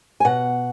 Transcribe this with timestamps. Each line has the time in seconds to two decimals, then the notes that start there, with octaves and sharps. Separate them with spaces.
0.20 G#5
0.25 B2 F#5